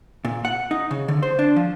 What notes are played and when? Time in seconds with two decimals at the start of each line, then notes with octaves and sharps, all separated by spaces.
0.25 A#2
0.45 F#5
0.71 D#4
0.91 C#3
1.08 D3
1.23 C5
1.39 D4
1.56 F3